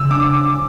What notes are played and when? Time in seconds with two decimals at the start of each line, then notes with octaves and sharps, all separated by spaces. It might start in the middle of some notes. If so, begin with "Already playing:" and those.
Already playing: C#3 E6
0.11 D4 D6